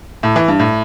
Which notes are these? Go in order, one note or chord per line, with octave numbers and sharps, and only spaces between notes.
A2
E3
G2
A2